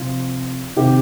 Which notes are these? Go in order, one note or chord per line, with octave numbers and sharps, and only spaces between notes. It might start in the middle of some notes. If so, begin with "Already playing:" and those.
Already playing: C3 F3 F4
C3 D#3 G4